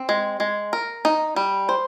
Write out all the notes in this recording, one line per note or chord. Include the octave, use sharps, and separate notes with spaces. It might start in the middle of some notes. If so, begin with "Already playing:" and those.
Already playing: C4
G#3
G#3
A#4
D#4
G3
C5